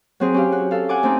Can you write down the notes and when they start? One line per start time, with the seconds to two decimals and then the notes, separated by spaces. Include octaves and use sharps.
0.20 F#3 C4 G#4
0.34 C#4 G4 F5
0.52 F#4
0.71 A4 F5
0.89 F#5 G#5 D6
1.03 A3 C4 C#4 D#4